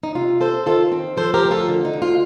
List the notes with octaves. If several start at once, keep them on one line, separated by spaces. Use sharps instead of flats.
D#4
C3 F4
C4 A4 C5
D#3 F4 A4
C4
F3 A4 C5
G4 A#4
D2
F4 A4
D3
D#4
D2
F4